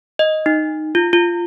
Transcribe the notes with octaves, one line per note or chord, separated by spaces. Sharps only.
D#5
D#4
F4
F4